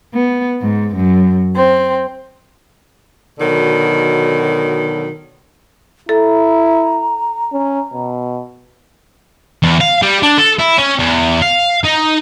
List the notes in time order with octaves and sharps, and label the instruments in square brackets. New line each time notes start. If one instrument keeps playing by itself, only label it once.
[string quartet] B3
G#2
F#2
C4
[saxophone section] B2 D3 D#3 F#3
[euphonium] E4 [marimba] A4 [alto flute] A#5
[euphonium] C#4
B2
[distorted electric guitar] E2
F5
G3
D4
A4
E4
C#4
E2
F5
D#4